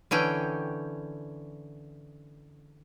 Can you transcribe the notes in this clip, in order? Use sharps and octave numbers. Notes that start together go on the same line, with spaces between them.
D3 E3 C#4 G5